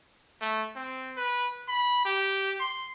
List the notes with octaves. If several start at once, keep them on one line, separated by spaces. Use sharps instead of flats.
A3
C4
B4
B5
G4
C6